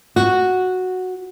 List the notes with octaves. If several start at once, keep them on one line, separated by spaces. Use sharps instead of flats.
F#4